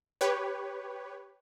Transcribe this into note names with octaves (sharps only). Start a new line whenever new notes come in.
G4 B4 C#5